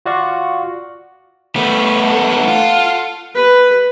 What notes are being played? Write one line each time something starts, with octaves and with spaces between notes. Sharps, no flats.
F4 F#4 D5 F5 C#6
A3 B3 B5
A4 F#5
F4
B4